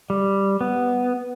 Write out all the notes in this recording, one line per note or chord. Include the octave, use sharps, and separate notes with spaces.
G3
B3